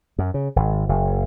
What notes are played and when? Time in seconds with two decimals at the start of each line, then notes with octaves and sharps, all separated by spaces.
0.19 F#2
0.34 C#3
0.56 G#1
0.89 F#1